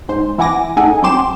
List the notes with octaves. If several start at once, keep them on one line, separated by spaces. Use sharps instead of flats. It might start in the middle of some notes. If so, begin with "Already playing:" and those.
G#2 C5
E3 E4 F#5 G#5 D6 A#6
A2 D#4 G#4 A4 F#5 G#5
F#3 C4 G5 C6 D6 E7